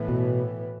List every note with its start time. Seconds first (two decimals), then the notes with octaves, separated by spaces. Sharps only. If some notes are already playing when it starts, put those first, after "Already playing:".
Already playing: A2 E3 B3
0.08 B2